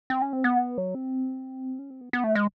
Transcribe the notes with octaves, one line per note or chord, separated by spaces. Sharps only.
C4
C#4
C4
B3
F#3
C4
C#4
C4
B3
B3
A3
G#3